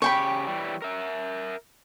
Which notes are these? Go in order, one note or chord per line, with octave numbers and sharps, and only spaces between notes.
C#3 G4 C#5 G5 B5
E3 G3
A#4 E5